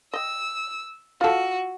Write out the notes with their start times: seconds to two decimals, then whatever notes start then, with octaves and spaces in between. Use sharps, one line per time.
0.13 D#5 G5 E6
1.21 F4 F#4 A4